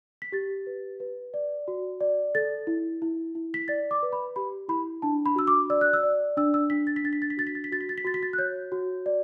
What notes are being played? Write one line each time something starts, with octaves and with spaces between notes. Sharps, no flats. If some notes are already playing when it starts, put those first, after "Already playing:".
B6
G4 A6
B4
B4
D5
F#4
D5
A4 A6
E4
E4
E4
B6
D5 A6
D6
B4
B5
G4 B5
E4 B5
D4 A5
B5
F#4 E6
D6
D5 E6
F#6
E6
D5
D4 E6
E6
D4 B6
A6
B6
D4 A6
B6
A6
B6
F#4 A6
B6
A6
B6
F#4 A6
B6
A6
B6
F#4 A6
B6
A6
F#6
C#5 G6
F#4
D5